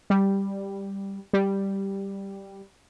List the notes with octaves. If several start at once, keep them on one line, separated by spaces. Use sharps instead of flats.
G3
G3